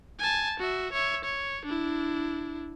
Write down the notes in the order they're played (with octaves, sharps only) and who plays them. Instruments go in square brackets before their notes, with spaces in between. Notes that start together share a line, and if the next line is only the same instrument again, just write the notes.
[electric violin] G#5 A5
F#4 E5
C#5 E5
C#5
D4 E4